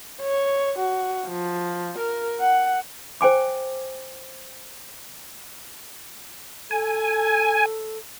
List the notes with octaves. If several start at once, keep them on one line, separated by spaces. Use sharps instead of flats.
C#5
F#4
F3
A#4
F#5
C5 G5 G#5 D6
A4 G#5